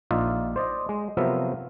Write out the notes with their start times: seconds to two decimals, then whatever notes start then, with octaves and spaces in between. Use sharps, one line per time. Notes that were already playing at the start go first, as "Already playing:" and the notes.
0.11 A#1 D#4 F4 D5 E5 F5
0.56 C5 D5 D#5
0.89 G#3
1.17 C3 F3 F#3 B3 A#4 E5